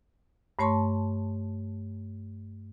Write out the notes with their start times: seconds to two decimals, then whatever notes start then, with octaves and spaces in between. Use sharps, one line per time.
0.59 G2 A3 C#5 A5 C6 C#6